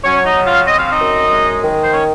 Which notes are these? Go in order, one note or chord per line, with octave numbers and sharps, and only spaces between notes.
F#3 C#4 C#5
C#5
D#4 D#5
C#3
F4 F5
C4 D#5
F5
D#4 D#5
F#2
G#3
D#3
C5
C#4 C#5